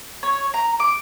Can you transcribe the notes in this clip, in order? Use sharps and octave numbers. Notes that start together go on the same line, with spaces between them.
C#5
A#5
D6